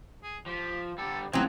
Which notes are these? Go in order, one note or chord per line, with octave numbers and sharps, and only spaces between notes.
G#4
F3 G4
D3 G3 A4
A1 G#2 F3 F#3 C4 D#5